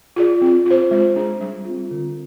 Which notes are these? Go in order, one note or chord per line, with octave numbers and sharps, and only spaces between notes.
F4 G#4 D5
C4
F4 C5
G#3
D4 G#4
G3
C4 F4
D3